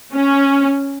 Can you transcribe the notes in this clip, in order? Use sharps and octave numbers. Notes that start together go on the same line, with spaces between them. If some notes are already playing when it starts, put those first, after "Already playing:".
C#4